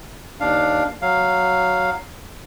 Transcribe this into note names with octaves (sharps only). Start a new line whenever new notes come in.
D#2 D4 F5
F#3 F5